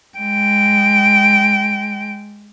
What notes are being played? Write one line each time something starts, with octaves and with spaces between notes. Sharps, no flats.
G#3 G5